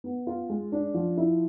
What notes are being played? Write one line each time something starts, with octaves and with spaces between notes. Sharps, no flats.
B3
F4
G#3
D4
F3
E4